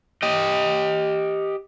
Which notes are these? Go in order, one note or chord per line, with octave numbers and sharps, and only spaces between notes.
G4 D#5